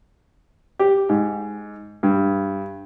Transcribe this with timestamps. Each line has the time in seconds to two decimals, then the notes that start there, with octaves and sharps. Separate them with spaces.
0.79 G4
1.09 G#2
2.03 G2